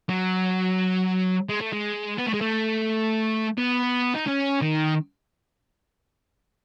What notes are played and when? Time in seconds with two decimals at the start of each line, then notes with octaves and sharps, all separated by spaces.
0.09 F#3
1.49 G#3
1.61 A3
1.73 G#3
2.18 B3
2.26 A3
2.33 G#3
2.41 A3
3.58 B3
4.16 D#4
4.28 C#4
4.62 D#3